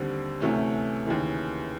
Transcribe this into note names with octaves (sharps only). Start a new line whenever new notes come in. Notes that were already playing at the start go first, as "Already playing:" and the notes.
Already playing: D#2 D3 G3 C4
D2 C3 E3 A3 C#4
D#2 C#3 E3